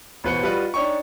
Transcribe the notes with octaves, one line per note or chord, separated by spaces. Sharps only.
A1 B2 B4 C5 C#7
G3 F4 F#4 B4 D#5
D4 D#4 C#5 G5 C#6